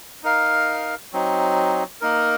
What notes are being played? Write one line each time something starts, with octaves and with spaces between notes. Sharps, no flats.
D#4 A#4 F5
F#3 C4 D#4
A#3 D#4 A#4